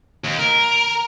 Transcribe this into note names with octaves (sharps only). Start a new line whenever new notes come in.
D#2
A#4